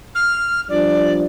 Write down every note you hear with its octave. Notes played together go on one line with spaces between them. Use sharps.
F6
F3 G3 D4 D5